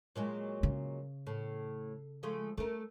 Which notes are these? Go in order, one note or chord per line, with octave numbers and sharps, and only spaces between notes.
A#2 F#3 G#3
C#3
A2
F3 G#3 A3
A3 C#4 A#4